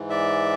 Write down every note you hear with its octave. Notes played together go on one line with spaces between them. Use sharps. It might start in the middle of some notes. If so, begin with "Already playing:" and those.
Already playing: G#2 E3
D5 E5